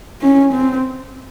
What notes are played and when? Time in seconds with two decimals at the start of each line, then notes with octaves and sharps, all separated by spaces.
0.22 C#4
0.53 C4